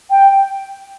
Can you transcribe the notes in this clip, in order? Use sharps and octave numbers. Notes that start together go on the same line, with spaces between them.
G5